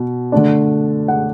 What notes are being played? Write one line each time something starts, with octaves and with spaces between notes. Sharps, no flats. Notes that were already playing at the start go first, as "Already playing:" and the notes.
Already playing: B2
D3 A3 D4
F#5